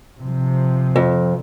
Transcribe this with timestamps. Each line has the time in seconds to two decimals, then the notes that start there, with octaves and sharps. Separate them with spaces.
0.21 C3 F3
0.96 F2